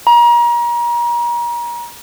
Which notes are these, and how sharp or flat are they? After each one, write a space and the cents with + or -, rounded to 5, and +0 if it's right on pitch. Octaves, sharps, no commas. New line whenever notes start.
A#5 +35